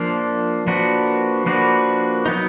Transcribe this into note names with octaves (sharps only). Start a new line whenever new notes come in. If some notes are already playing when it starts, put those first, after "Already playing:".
Already playing: F3 A#3 D4
F3 A#3 D4 F#4 B4
F3 A#3 D4 F#4 B4
F#3 B3 D#4